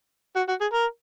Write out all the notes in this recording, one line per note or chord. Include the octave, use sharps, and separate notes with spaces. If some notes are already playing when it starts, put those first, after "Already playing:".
F#4
F#4
G#4
A#4